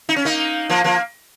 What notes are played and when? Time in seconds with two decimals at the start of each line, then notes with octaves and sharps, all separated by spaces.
0.09 D#4
0.16 C#4
0.25 A#3 D#4
0.69 F3 A#3
0.84 F3 A#3